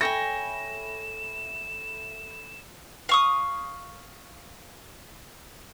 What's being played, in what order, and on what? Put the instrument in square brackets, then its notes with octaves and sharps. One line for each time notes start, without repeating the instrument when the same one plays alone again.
[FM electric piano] A4 E5 B5 [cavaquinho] C#5 G5 G#5 [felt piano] A#6 [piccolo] E7
[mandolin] F5 C#6 D#6